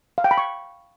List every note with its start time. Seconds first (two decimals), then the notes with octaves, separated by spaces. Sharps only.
0.18 F5
0.24 G5
0.31 B5
0.38 C#6